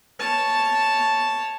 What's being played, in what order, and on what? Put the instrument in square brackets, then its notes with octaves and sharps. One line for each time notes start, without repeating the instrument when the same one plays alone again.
[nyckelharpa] C#5 A5